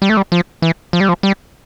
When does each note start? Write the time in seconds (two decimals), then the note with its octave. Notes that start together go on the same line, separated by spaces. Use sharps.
0.02 G3
0.09 A3
0.17 G3
0.32 F3
0.62 E3
0.93 F3
1.00 G3
1.09 F3
1.23 G3